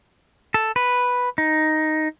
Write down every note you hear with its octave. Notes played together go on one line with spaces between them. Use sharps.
A4
B4
D#4